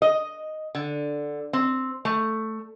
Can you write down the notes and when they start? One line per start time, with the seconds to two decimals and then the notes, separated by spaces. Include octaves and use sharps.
0.02 D#5
0.75 D3
1.53 C4
2.05 A3